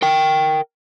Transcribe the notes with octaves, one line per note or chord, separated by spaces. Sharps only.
A#4 G5